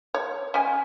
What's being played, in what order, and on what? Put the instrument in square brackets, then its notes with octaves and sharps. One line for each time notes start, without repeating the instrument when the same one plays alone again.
[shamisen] C#5
C#4 G#5